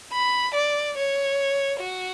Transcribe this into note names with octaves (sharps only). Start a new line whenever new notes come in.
B5
D5
C#5
F#4